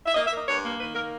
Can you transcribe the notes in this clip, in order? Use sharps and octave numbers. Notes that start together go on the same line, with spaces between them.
E5
A#3 D#5
E5
A#3
D#5
G2 C#5
A#3
D#3 B4
A#3 A#4